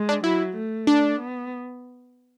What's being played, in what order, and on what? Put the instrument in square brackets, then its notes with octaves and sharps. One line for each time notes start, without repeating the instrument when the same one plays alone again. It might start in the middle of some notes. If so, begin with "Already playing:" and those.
Already playing: [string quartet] G#3
[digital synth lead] D4
[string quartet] F#3 [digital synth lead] E4
[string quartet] A3
[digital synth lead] D4
[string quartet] B3